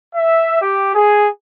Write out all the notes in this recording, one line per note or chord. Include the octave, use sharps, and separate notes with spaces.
E5
G4
G#4